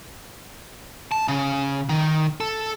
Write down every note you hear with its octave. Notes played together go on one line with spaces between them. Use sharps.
A5
C#3
D#3
A4